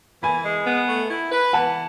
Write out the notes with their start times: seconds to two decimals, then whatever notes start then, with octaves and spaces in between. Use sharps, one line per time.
0.23 E3 G#5 B5
0.44 G#3
0.67 B3
0.89 A3
1.10 E4
1.32 B4
1.53 E3 F#5 A5